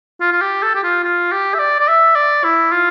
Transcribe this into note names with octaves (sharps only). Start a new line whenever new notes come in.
F4
F4
G4
A4
G4
F4
F4
G4
E5
D5
D5
E5
D5
E4
F4